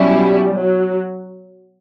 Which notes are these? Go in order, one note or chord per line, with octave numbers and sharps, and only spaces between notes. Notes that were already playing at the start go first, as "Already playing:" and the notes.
Already playing: B2 F#3 G3 C#4 E4
F#3